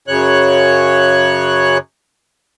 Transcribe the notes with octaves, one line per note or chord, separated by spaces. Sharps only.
F#2 C#3 C#5 F#6